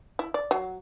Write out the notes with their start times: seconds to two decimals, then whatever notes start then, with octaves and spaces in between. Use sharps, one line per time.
0.19 E4
0.34 D5
0.51 F#3